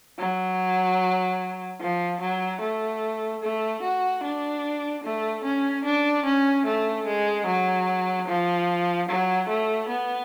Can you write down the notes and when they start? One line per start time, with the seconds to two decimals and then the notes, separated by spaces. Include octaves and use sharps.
0.19 F#3
1.81 F3
2.21 F#3
2.61 A3
3.42 A3
3.82 F#4
4.23 D4
5.04 A3
5.45 C#4
5.85 D4
6.25 C#4
6.66 A3
7.07 G#3
7.46 F#3
8.28 F3
9.09 F#3
9.49 A3
9.89 B3